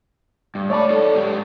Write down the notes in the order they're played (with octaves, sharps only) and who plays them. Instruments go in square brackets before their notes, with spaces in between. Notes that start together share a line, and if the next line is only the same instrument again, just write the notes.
[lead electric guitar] G2
[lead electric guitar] A3 B5 [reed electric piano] C#5 D5 A5
[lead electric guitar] D#4 A4
G#2 G4